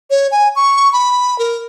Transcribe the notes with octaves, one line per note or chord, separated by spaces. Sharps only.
C#5
G#5
C#6
B5
A#4